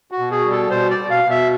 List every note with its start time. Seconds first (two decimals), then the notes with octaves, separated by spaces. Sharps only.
0.11 F#4
0.19 B2
0.31 G#4
0.45 G3
0.51 A4
0.70 B2 C5
0.90 D5
0.97 B2
1.10 F5
1.24 B2
1.30 E5